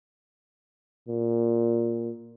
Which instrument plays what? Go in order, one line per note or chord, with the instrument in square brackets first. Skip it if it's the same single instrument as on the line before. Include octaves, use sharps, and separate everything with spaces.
[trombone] A#2